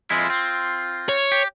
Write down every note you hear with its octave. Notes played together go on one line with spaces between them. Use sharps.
F2 G#3 E4 F4
C4
C#5
G4